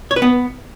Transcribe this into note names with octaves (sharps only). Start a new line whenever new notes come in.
C#5
B4
B3